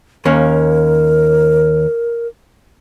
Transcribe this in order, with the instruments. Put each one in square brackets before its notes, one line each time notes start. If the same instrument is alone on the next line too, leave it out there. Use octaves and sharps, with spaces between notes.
[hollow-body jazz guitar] D#2 A#3 C#4 [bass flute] A#4